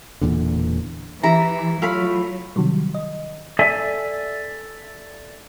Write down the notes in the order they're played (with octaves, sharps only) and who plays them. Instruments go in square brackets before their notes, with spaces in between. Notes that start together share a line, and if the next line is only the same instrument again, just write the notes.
[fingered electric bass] E1 E2 A#2 D3
[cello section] E3 [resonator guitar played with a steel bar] E4 [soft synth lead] G4 [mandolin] A#5
[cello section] F#3 [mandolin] A3 F5 B5 [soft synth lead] F4
[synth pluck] C3 D#3 F#3 G3
D#5
[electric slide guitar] A4 D5 E5 G#5